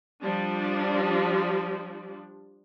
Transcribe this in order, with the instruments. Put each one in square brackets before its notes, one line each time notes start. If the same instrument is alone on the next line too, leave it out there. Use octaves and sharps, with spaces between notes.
[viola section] F3 G3 D4